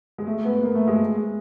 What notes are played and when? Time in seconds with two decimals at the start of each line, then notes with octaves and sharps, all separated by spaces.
0.18 G#3
0.27 A3
0.45 B3
0.63 A#3
0.75 A3
0.88 G#3